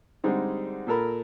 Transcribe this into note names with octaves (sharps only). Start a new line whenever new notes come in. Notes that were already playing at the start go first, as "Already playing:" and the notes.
D3 G3 G#3 C4 D#4 G#4
A#2 A4 A#4 B5